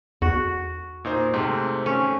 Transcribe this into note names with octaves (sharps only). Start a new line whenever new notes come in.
E2 F#4
A#2 D#4 C5
G#2 C3 A3 C4
C#4